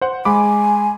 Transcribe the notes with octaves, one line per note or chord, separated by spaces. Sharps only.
C5 F#5
G#3 G#5 B5 D6